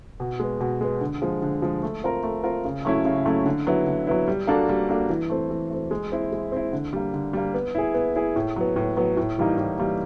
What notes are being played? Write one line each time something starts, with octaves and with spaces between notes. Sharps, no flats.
B2
G#3 B3
B2
G#3 B3
D3
F3 G#3
D3
F3 G#3
A3
C4 F4 A#4
A3
C4 F4 A#4
C#3
F#3 A3 C#4 E4
C#3
F#3 A3 C#4 E4
D3
F#3 B3 E4
D3
F#3 B3 E4
G3
A#3 D4 F#4 A4
G3
A#3 D4 F#4 A4
E3
A3 C4
E3
A3 C4
G#3
C4 E4
G#3
C4 E4
D3
G3 A#3
D3
G3 A#3
B3
E4 G#4
B3
E4 G#4
A2
F#3 B3
A2
F#3 B3
A2
E3 G3 A#3 D#4
A2
E3 G3 A#3 D#4